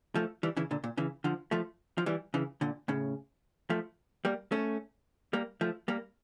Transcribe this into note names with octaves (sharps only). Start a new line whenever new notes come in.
F3 A3
E3 G3
C#3 E3
A#2 D3
A#2
C#3 E3
D3 F3
F3 A3
F3
E3 G3
C#3 E3
A#2 D3
A2 C#3
F3 A3
G3 A#3
A3 C#4
G3 A#3
F3 A3
G3 A#3